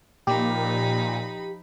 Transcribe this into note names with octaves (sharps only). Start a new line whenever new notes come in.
A#2 F3 D#4 G4 B5